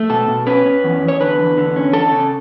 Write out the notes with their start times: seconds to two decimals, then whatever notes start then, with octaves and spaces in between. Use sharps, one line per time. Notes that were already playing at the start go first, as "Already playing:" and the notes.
Already playing: A3
0.10 B2 A4
0.28 B2
0.47 C#4 B4
0.66 C#4
0.84 E2
1.02 E2
1.08 C#5
1.20 D3 B4
1.38 E2
1.57 D3
1.76 C#4
1.93 E2 A4
2.12 C#3